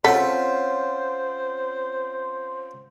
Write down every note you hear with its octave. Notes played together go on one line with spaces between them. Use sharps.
C4 C#4 F4 A4 C5 C#5 F#5 B6